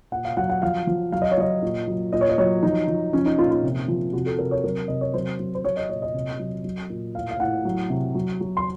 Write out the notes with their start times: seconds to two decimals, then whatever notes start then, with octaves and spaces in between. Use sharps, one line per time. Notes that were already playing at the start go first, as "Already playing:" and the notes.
0.12 A#2 F#5
0.25 F5
0.37 F#3 F#5
0.50 F#5
0.62 F3 F5
0.87 F3
1.12 F#3 F5
1.22 D#5
1.31 C#5
1.38 F#3 D#5
1.62 A#2
1.87 F#3
2.13 A#2 D#5
2.21 C#5
2.29 D#5
2.38 F#3 C#5
2.63 F3 D#4
2.88 F3
3.13 F3 C#4
3.26 D#4
3.38 A#2 F4
3.51 F4
3.63 C3
3.88 F3
4.13 C3 F#4
4.26 A4
4.39 C3 A#4
4.51 C#5
4.64 F#3 A#4
4.88 C3 D#5
5.01 C#5
5.14 F#3 C5
5.39 F#3
5.55 C5
5.64 F#3 C#5
5.77 D#5
5.89 A#2 C#5
6.02 D#5
6.14 C3
6.39 F#3
6.64 F#3
6.90 A#2
7.15 A2 F5
7.31 F5
7.40 A2 F#5
7.65 F#3
7.90 C3
8.15 F#3
8.41 F#3
8.57 C6